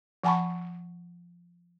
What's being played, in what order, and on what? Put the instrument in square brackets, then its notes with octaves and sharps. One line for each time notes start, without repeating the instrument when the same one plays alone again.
[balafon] F3 F#5 G#5 A5 B5 C#6